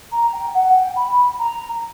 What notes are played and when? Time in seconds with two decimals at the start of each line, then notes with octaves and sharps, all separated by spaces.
0.12 A#5
0.33 G5
0.54 F#5
0.75 G5
0.96 B5
1.39 A#5